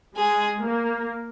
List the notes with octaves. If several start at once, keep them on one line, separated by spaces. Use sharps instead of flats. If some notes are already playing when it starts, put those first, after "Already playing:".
G#3 G#4
A#3